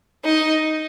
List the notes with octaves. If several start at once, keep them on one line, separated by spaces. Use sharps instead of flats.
D#4